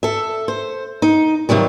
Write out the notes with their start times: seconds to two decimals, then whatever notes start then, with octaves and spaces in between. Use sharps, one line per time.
0.03 A4 E5
0.48 C5
1.02 D#4
1.49 C3 D#3 F#3 G3